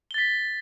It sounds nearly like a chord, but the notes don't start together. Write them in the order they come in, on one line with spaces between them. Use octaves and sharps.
G7 A6 B6